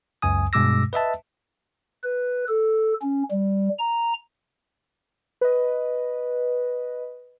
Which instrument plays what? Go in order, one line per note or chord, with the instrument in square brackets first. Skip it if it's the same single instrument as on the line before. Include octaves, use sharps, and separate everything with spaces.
[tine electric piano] C#2 F#2 G#5 D#6
G2 B2 G#3 D6 E6 A#6
B4 D#5 E5 A5
[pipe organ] B4
A4
C#4
G3
A#5
[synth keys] B4 D#5